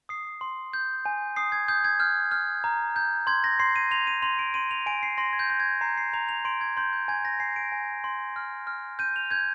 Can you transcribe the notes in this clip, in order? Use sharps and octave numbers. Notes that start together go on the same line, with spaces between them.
D#6 C7
C6
G6
G#5
D#6 C7
G#6
D#6 G6
G#6
F6 G6
F6
A#5
G6
C6 G#6
A#6
C6 C7
D#7
C6 F7
D#7
C6 F7
D7
C6 D#7
F7
G#5 D7
C7
C6 A#6
G#6
G6
G6
G#6
A#5 C7
C7
A#5 F7
F7
C6 D7
G#6
C6 G6
G6
G#5 G#6
A#6
G#5 C7
D7
G#5
C6
F6
F6
G6 D#7
F7
G6 G#6